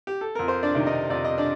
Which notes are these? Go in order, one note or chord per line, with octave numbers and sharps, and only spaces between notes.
G4
A4
F2 A#4
C5
D4 D5
C3 D#3
D#4 D#5
F2 D5
D#5
D4 D5